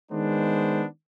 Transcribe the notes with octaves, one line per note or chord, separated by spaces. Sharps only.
D#3 G#3 B3 D4 C5